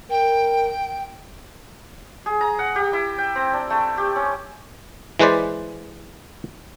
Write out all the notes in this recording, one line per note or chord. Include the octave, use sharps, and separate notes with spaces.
A#4 G5
G#4
A#5
F#5
G4
E4
G5
C4
D4
A3
G4
C#4
E3 G#3 B4 C5 D5